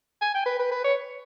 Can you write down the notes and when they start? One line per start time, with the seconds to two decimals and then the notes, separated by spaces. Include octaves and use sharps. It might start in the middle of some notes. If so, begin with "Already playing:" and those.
0.22 G#5
0.35 G5
0.46 B4
0.59 B4
0.71 B4
0.84 C#5